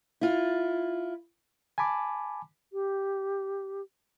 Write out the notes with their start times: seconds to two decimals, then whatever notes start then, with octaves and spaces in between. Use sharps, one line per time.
0.21 E4 F4
1.78 G#5 A5 B5 D6
2.73 G4